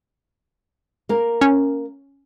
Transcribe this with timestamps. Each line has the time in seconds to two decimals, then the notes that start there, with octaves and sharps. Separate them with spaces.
1.09 A#3 A#4
1.41 C#4